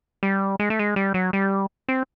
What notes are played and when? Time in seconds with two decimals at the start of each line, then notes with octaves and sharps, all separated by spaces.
0.23 G3
0.59 G#3
0.70 A3
0.79 G#3
0.96 G3
1.14 F#3
1.33 G3
1.88 C4